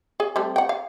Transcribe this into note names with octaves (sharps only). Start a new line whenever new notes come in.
G#4 G#5
G3 A3 C4
F#5 G5
F5